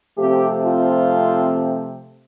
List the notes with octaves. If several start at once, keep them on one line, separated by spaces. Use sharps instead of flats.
C3 F3 A3 C4 G4
F4